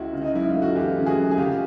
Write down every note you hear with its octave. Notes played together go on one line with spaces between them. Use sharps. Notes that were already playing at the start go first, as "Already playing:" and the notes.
Already playing: C#2 E4 F#4
C#3
D#4
F#2 E4
F4
A3
F#4
E3 F4 G4
C#3
F#4 G#4
F#2
G#4
C#3 F4 G4